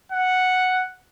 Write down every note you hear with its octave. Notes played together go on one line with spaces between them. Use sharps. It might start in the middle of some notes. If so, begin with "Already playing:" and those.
F#5